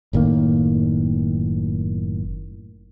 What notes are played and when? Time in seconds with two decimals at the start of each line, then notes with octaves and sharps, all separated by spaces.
0.13 F#1 A2 D#3 A#3